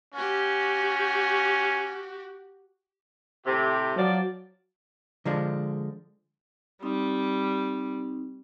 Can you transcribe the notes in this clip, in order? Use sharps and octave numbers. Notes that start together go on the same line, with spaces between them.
C#4 F#4 G4
A2 C3 G4
F3 F#3 D5
D3 F3 G#3 D4
G3 C4 D#4